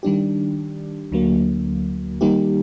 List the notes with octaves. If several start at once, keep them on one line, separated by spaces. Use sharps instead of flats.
D#3 G3 D4 G4
D2 D3 F#3 A#3
D#3 G3 A#3 D#4 G4